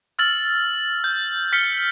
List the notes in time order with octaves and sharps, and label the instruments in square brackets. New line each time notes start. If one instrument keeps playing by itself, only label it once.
[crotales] E6 F6 A6 F#7
G6
F6 B6 C#7 G7